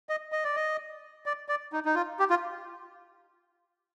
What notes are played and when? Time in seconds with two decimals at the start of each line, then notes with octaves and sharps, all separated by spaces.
0.09 D#5
0.32 D#5
0.44 D5
0.56 D#5
1.26 D5
1.49 D5
1.73 D#4
1.85 D#4
1.95 F4
2.19 G4
2.30 F4